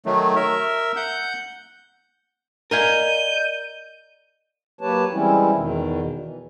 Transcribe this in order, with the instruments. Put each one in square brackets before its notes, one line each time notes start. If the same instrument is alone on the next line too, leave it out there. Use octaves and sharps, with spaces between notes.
[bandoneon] D#3 F#3 A3
A#4 E5
F#5 G6
[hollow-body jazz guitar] A#4 F5 G#5 [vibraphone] D5 D#5 [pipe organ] G6 [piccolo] D#7
[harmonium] F#3 A#3 G4 B4 C#5 A5
E3 G3 G#3 C4 C#4 E4
E2 B2 D#3
E3